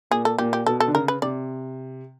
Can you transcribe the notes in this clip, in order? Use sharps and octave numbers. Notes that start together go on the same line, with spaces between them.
A#2 G#4
A4
A#2 G4
G4
B2 A4
A4
D3
C#3 A#4
B4
C3 D5